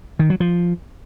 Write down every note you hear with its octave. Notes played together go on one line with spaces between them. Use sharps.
D#3
F#3
F3